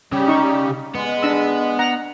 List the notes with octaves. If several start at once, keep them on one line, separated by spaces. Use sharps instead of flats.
C#3 G3 G4
D#4 C#6
G#3 B3
D4 E6
F#5 A#5